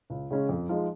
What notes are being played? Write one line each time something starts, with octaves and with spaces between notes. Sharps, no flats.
C#2
C#3 G#3 C#4
F2
F3 G#3 D#4